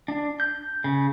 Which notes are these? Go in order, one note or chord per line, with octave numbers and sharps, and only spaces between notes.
D4
G6
C#3